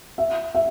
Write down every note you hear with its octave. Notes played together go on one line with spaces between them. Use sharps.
E5
E5